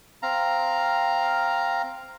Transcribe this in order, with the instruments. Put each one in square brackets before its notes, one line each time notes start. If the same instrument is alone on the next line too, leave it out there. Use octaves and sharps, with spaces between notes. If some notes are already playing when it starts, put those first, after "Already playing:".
[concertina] C4 F5 A#5